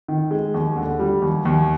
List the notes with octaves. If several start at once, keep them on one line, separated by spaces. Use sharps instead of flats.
D#3
G#3
D#2
D3
G3
D#2
D#2